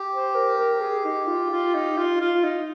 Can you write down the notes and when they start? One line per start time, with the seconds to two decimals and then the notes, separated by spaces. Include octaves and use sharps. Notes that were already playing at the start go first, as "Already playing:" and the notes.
Already playing: G4
0.11 C5
0.35 A#4
0.58 A#4
0.81 G#4
1.05 D#4
1.27 F4
1.51 F4
1.75 D#4
1.98 F4
2.21 F4
2.44 D#4